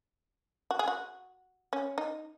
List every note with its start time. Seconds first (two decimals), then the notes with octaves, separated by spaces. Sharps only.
0.71 F#4
0.79 G#4
0.88 F#4
1.73 C#4
1.98 D#4